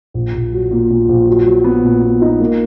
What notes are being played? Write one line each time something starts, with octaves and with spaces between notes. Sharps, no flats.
A#1
A#1
F#3
A#2
A#2
A#1
F#3
F#3
B3
A#2
B3
D#4
A#3